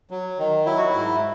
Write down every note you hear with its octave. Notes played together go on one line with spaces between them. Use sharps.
F#3
D#3
F#3 E4
F#4
G#2 E4